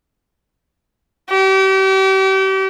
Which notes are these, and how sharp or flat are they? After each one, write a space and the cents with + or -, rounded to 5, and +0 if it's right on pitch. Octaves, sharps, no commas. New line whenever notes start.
G4 -35